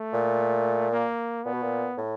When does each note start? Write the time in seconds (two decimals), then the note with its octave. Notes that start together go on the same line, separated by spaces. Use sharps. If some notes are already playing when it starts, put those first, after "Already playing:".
Already playing: A3
0.13 A#2
0.92 A#3
1.44 A#2 B3
1.53 B2
1.63 A#2
1.97 A2